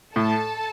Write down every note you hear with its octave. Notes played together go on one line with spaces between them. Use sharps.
A2 A4 A5